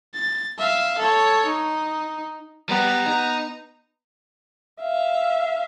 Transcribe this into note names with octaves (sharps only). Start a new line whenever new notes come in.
A6
E5 F5
A4 C#5
D#4
G3 B3 G4 A#5
D#4
E5 F5